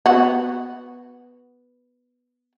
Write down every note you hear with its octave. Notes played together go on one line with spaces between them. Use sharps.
B3 F#4